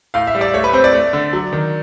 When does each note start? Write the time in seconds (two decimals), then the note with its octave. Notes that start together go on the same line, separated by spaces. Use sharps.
0.14 A2 F5
0.27 E5
0.35 G3
0.41 D5
0.54 A3 C#5
0.64 B4
0.73 C4 C5
0.84 D5
0.93 A3
1.13 D3
1.33 F#3
1.53 D#3